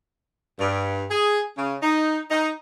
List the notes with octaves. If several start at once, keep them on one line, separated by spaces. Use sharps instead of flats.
G2
G#4
C#3
D#4
D#4